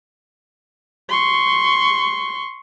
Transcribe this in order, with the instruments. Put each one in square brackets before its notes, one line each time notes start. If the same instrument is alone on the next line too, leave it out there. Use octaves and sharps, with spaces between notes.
[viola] C6 C#6